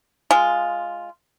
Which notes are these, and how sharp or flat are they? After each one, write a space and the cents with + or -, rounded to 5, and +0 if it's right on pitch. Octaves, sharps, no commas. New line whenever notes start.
G#3 +0 F4 +0